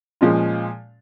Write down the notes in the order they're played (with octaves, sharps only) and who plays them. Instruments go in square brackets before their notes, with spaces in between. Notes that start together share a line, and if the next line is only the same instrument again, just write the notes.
[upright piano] A#2 F3 G#3 C#4 F4